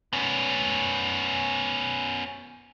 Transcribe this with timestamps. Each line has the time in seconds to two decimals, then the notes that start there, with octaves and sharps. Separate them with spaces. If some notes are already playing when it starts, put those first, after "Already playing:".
0.13 B3 C#4